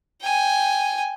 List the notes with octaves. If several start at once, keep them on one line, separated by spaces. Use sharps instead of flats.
G5 G#5